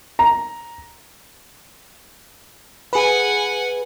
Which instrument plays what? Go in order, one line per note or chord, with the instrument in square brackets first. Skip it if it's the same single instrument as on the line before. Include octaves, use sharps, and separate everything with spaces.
[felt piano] A#5
[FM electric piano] G#4 B4 [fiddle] F#5 G#5